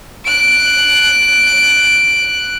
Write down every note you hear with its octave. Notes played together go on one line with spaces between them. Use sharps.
F#6 D7